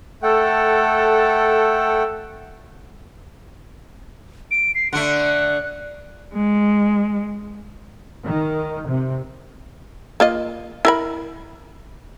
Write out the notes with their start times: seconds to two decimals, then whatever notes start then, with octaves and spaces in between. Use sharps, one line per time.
0.23 A3 A4 F#5 G5
4.51 D7
4.75 C7
4.93 D3 A3 F#6
6.34 G#3
8.25 D#3
8.88 C3
10.20 A#3 F4 D#5
10.85 E4 A#4 B5